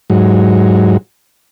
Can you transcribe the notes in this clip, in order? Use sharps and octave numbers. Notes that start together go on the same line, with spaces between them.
G#2 F#3